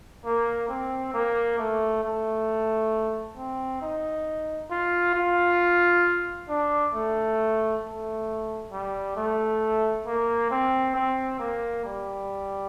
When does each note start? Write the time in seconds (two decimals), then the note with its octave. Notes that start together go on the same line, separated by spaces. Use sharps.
0.25 A#3
0.69 C4
1.13 A#3
1.58 A3
2.03 A3
3.37 C4
3.81 D#4
4.71 F4
5.15 F4
6.48 D4
6.94 A3
7.83 A3
8.71 G3
9.16 A3
10.06 A#3
10.51 C4
10.95 C4
11.39 A#3
11.84 G3